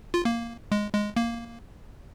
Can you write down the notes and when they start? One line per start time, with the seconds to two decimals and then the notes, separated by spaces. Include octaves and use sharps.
0.14 F4
0.25 A#3
0.72 G#3
0.94 G#3
1.16 A#3